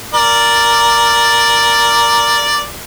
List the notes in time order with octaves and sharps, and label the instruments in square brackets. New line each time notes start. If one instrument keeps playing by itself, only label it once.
[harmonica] A#4 D5